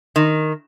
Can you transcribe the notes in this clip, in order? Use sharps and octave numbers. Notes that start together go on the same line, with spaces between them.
D#3